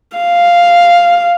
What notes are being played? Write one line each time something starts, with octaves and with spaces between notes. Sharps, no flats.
F5